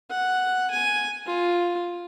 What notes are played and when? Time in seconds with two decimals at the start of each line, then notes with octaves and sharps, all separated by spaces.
0.10 F#5
0.71 G#5
1.26 F4